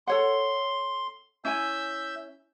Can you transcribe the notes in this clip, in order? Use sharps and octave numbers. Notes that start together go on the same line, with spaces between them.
A4 C#5 F#5 C6
C#4 E4 E5 G#5 E6 G6